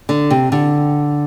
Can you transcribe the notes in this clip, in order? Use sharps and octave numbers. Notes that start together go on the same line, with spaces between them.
D3
C3
D3